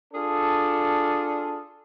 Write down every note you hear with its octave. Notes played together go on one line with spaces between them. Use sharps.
D4 F4 G#4 A4